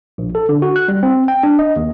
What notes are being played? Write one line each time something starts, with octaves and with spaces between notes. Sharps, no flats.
A#1
A4
D3
F#4
F#6
G3
C4
G5
D4
D#5
D#2